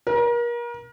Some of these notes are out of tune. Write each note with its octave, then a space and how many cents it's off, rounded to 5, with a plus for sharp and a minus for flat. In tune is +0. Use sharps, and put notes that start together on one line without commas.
A#4 +35